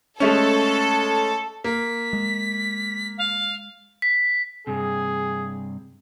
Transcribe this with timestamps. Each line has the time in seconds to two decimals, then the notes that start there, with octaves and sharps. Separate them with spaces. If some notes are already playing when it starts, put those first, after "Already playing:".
0.20 G#3 A3 C#4 A4
1.64 A#3 B6
2.13 G#3
3.18 F5
4.02 B6
4.67 G2 C3 G#4